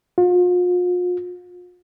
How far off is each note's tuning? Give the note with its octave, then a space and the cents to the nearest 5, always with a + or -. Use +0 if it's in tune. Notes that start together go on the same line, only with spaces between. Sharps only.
F4 +40